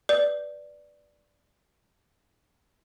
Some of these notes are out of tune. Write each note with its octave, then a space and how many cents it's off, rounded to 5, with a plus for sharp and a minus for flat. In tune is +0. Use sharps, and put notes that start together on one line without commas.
B4 +0 D5 +0